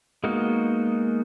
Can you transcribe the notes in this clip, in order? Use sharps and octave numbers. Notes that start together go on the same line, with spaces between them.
G#3 A#3 B3 D#4 F#4